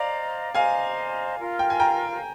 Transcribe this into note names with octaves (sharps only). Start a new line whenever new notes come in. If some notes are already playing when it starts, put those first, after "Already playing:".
Already playing: C5 D5 D#5 F5 A#5
C5 D#5 F5 G#5 A#5
F4 A#4 F5
G5
G#5
G5 A#5